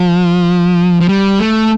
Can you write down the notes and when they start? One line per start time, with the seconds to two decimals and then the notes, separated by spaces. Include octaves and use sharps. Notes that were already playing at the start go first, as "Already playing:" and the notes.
Already playing: F3
1.00 F3
1.09 G3
1.39 A3